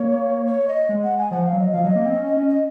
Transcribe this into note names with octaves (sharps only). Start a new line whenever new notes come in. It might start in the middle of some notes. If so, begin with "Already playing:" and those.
Already playing: A#3 C#5
C#5
D#5
G#3
F#5
G#5
F3 F#5
F5
F#3
D#5
F3 F5
F#3 D#5
A#3
C4
C#4
C#4
D#5